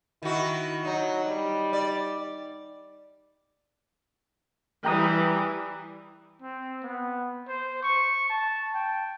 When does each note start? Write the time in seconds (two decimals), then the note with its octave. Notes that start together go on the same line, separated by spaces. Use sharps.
0.23 D#3 E4 F#4
0.85 F#3 D#4
1.26 G3
1.73 D5
4.85 E3 G3 G5 A#5 D#6
6.42 C4
6.83 B3
7.48 C5
7.83 C#6
8.30 A5
8.74 G5